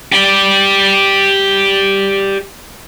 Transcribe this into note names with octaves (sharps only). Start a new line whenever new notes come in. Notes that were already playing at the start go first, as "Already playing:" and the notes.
G4 D5